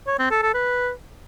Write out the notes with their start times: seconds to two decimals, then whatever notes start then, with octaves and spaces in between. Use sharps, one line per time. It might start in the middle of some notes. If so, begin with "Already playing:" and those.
0.07 C#5
0.19 C4
0.31 A4
0.42 A4
0.54 B4